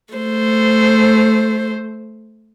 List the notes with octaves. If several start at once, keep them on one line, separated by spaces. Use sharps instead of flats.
A3 C5